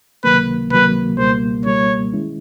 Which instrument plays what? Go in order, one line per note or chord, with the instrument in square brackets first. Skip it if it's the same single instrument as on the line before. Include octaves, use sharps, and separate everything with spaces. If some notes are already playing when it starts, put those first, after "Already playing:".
[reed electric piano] C#2 C3 D#3 F#3 A#3 [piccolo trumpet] B4
[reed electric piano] C#2 C3 D#3 F#3 A#3 [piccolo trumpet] B4
[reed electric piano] C#2 B2 G3 A#3 [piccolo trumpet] C5
[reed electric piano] C#2 B2 G3 A#3 [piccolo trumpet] C#5
[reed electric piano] D#3 G#3 C#4 E4